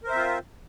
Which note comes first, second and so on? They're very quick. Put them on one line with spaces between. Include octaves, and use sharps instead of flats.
A#4 C5 E5 C4 F4